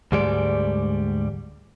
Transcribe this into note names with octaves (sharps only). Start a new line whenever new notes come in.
D2 G#2 G3 G#3 D5